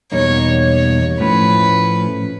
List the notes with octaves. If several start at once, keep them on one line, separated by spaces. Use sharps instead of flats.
E2 B2 G3 A#3 D#4 C#5
C#5
A2 F3 A3 C#4 B4